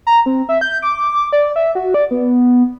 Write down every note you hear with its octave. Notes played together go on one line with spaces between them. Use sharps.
A#5
C4
E5
G6
D6
D5
E5
F#4
D5
B3